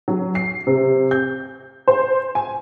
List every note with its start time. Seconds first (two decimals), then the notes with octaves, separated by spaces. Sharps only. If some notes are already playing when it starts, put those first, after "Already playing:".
0.08 F#3
0.35 C7
0.67 C3
1.11 G6
1.88 C5
2.35 G#5